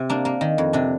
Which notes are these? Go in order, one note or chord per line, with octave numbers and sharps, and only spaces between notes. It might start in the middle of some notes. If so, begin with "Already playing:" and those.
Already playing: C3
A#3 D4
A#3
D#3
F2
C3 D4